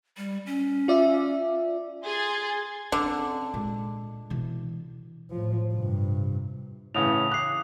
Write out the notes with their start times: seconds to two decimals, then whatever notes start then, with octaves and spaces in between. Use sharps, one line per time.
0.17 G3
0.46 C#4
0.88 F4 D5 E5
2.03 G#4 G#5 C6 G#6 A6
2.92 D3 C4 C#4
3.54 A#2 G#3
4.30 B2 E3
5.31 A2 F3
5.74 G2 C3
6.95 A2 C#3 E3 D#6 F7
7.32 D6 D#6 F#6 C7